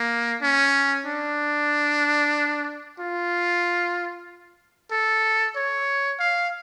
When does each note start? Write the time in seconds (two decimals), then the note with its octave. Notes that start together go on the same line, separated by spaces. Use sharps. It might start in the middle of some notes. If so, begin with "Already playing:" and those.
Already playing: A#3
0.42 C#4
1.06 D4
2.99 F4
4.91 A4
5.56 C#5
6.20 F5